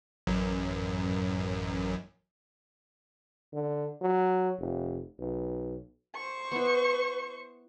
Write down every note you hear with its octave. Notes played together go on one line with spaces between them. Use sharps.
A1 F#2
D3
F#3
F1
B1
C5 C#6
B3 E4